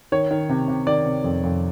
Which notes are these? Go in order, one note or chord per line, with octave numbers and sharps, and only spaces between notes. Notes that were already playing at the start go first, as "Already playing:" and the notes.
D#3 C#5
D#3
C3
C3
D#3 D5
C3
F2
F2